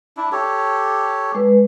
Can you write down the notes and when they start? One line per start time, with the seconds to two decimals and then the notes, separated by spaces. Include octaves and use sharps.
0.17 D4 E4
0.32 G4 A4 C#5
1.35 G#3 B4